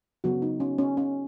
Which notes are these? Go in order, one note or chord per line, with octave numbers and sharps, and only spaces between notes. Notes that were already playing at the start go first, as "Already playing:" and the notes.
C#3 F#3 B3 F#4
D#4
C#4
C#4
C#4